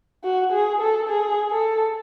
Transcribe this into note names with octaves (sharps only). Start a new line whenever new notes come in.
F#4
G#4
A4
G#4
A4